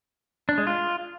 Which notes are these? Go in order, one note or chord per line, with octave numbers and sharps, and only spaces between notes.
D4
G#3
F4